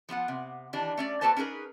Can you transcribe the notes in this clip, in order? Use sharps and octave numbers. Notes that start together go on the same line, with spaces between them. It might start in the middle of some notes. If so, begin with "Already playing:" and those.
F3 B3 F4 F#5
C3
D#3 E3 D4 G4
A3 C#4 D5
A#3 F#4 A4 B4 C5 A5
C#4 D#4 G#4 A#4 B4